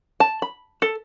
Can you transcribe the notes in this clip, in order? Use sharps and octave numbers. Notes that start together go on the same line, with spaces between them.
A5
B5
A4